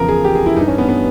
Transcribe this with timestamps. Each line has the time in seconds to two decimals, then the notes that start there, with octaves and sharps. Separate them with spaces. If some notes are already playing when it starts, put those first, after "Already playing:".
Already playing: E2 C#3 F3 A#4
0.09 G#4
0.25 G4
0.35 G#4
0.46 E4
0.56 G2 E3 G3 D#4
0.68 C#4
0.78 B3
0.89 B3